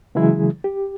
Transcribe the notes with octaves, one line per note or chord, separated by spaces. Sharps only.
C#3 E3 F#3 G#3 E4 G#4
G4